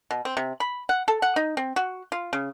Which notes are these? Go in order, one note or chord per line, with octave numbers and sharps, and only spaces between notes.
B2
C4
C3
B5
F#5
A4
F#5
D#4
C4
F#4
F4
C#3